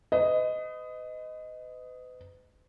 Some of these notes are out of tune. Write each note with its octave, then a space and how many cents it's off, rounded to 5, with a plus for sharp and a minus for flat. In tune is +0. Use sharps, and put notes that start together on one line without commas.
B4 +40 D#5 +0